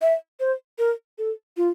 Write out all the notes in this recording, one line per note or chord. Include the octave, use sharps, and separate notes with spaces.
E5
C5
A#4
A4
F4